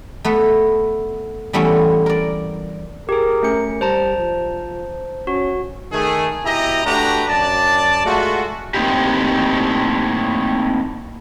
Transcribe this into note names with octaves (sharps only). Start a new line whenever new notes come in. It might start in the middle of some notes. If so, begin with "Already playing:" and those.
A3 B3 B4
E3 G3 A3 B3 C#4
A#4 D5
G4 G#4 A#4
A3 C#4 C#7
G3 C5 A5 A#5
F3
C#4 F#4
D#3 A3 G#4
B2 E4 G4 D#5 A#5
A3 D4 F#4 G4 B4 A#5
F#2 D5 A5
G#3 A3 F4 F#4
A3 A#3 C4 D#4 E4 G4